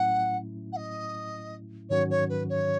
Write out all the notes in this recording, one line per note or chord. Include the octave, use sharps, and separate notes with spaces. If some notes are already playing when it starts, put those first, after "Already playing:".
Already playing: A2 F#3 A3 C#4 E4 F#5
F#5
D#5
G#2 D#3 F#3 C#4 F#4 C#5
C#5
B4
C#5